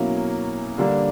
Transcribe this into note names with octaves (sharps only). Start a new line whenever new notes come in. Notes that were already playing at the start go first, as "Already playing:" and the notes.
Already playing: B2 F#3 A#3 C#4 E4
D3 G3 A#3 D4